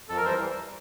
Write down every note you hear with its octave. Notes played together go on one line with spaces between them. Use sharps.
F2 A4
A#4
E3 G3 C5